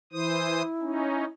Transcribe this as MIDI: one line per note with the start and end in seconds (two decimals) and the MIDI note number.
0.13 0.62 52
0.13 1.28 64
0.13 0.62 72
0.13 0.62 87
0.81 1.25 61
0.81 1.25 63